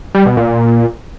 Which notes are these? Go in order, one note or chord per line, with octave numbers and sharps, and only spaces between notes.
G3
B2
A#2